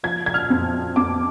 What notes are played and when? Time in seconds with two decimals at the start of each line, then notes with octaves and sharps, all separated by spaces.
0.03 F3 G#6
0.26 G#6
0.34 F6
0.50 F2
0.96 F2 D6